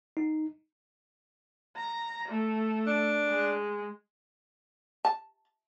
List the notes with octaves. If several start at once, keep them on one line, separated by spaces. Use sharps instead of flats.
D#4
A#5
A3
D4
G#3
A5